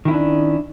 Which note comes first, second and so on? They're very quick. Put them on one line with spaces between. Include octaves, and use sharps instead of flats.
D#3 E4 C#4 D4